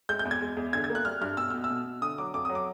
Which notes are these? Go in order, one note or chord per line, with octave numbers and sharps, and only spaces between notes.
G#3 G6
G6
E2
G#6
G#3
E2
D3 G#6
G#6
A#3
F#6
G3 F6
G2 F6
B2 E6
B2 F6
E6
B2
B2
D3 D#6
F#3 D6
F2 D6
D#6
F#3
D6